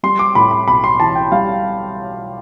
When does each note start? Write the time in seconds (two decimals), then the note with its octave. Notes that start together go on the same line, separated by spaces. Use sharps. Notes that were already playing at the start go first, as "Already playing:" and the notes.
0.03 G3 C6
0.19 D6
0.35 A2 B5
0.51 B5
0.68 B1 B5
0.84 C6
1.00 E3 A5
1.15 G5
1.32 G3 F5